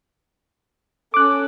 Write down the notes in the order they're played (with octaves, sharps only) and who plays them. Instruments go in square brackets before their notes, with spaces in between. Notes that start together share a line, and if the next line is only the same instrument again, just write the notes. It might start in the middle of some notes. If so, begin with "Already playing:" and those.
[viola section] C#4 A4 [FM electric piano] D6 F#6